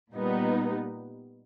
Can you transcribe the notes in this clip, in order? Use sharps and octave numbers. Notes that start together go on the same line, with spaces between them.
A#2 G3 B3 D#4